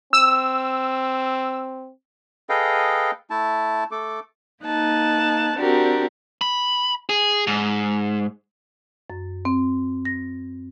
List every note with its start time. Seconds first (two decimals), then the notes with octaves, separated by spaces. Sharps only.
0.13 C4 E6
2.49 G#4 A4 B4 D#5 F5 G5
3.30 A3 E4 A5
3.91 A3 A4 D6
4.63 A#3 D#4 A5 F#6
5.57 C4 D4 F#4 G4 A#4
6.41 B5
7.09 G#4
7.47 G#2
9.10 F#2
9.45 C4
10.05 A#6